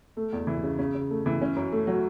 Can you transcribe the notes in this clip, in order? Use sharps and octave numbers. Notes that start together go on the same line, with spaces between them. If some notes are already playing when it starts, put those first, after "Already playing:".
A3
E2
E3
C#3
C#3
C#3
A3
E3
C#4
F#2
A3
F#3